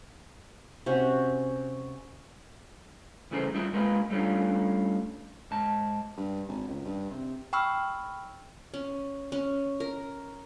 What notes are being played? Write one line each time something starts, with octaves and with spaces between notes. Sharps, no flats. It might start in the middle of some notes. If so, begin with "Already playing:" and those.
C3 C#4 F#4
C2 C#3 E3 A3 G#4 C5
G3 D#4 F4 D5 E5
G#3 A#3 D#4 F4 G#4 B4
G3 A3 C#4 D4 F4
G#2 A5
G2
G#1
C#2
G2
C3
G5 B5 C#6 E6 F6
C#4
C#4
A#4